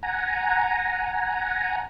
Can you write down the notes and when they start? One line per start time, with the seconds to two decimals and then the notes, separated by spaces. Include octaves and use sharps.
0.03 F#5 G#5 A#5